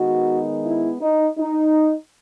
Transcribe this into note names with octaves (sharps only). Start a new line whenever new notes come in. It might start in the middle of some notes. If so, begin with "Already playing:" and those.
Already playing: D#3 G#3 B3 D#4 F#4
E4
D#4
D#4